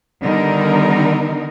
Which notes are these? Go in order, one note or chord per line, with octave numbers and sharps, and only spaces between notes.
D3 D#3 G3 B3 D#4 A#4